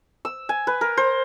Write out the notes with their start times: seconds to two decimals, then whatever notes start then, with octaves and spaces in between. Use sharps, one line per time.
0.25 E6
0.49 G#5
0.67 B4
0.81 A#4
0.97 C5